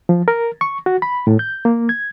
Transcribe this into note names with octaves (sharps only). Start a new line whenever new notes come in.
F3
A#4
C#6
F#4
B5
A2
G6
A#3
G#6